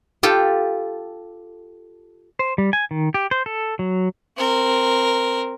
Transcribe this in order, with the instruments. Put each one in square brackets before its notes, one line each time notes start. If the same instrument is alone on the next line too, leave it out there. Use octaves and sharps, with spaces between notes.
[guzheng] F4 G4 A4
[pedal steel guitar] C5
G3
G#5
D#3
G4
C5
A4
F#3
[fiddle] C4 A#4